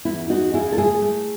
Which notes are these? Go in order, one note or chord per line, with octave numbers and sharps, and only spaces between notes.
E2 E4
E2 D#4 F#4
C#3 E4 G#4
A4
A3 E4 G#4
A3